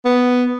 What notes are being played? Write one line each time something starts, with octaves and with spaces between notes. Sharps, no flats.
B3